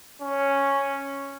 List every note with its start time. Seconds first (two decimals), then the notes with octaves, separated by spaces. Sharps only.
0.22 C#4